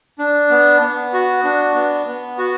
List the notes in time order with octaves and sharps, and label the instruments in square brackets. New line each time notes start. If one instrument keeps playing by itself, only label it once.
[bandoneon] D4
B3
B3
F#4
D4
B3
B3
F#4